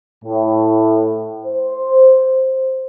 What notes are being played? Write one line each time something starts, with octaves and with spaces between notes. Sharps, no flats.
A2
C5